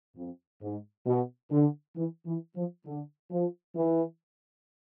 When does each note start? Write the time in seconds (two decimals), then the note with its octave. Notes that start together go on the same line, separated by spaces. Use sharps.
0.16 F2
0.62 G#2
1.06 B2
1.51 D3
1.96 E3
2.26 E3
2.56 F3
2.86 D3
3.31 F3
3.75 E3